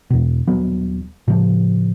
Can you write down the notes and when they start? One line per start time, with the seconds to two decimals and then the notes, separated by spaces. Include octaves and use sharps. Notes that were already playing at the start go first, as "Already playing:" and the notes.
0.10 E2 B2
0.48 D#1 F#3 B3
1.28 A2 C#3 F3